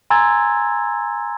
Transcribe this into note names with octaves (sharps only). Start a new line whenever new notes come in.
G#5 A#5 C6 E6 G#6 A6